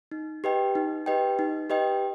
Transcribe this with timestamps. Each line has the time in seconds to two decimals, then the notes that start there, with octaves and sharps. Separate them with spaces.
0.11 D#4
0.44 G4 B4 D#5 G5
0.75 D#4
1.06 G4 B4 D#5 G5
1.39 D#4
1.70 G4 B4 D#5 G5